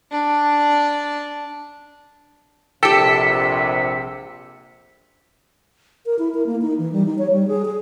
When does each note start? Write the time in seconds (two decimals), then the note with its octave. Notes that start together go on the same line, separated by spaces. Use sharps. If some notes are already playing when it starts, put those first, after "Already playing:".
0.11 D4
2.83 A#1 C3 G4 A4 G5 E6 B6 C#7
6.06 A#4
6.19 E4
6.35 A#4
6.46 A#3
6.62 D#4
6.78 E3
6.92 G3
7.06 D#4
7.18 C#5
7.31 G3
7.48 G#4
7.65 G#4